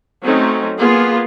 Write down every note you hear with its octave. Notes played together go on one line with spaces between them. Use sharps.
F#3 A3 C4 C#4 D#4
A#3 B3 F4 G#4